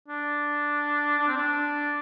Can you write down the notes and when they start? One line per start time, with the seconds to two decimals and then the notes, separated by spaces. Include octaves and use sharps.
0.08 D4
1.19 D4
1.28 C4
1.37 D4